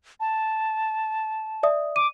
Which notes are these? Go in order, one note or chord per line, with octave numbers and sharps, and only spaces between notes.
A5
D5 E5 D#6
D6 D#7